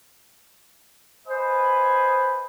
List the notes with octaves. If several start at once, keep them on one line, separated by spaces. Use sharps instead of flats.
B4 C5 D#5 G#5